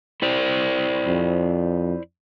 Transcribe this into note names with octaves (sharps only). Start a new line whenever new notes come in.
E4 C5 D5
F2